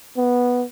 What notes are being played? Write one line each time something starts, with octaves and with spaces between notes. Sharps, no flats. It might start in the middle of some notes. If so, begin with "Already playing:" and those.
B3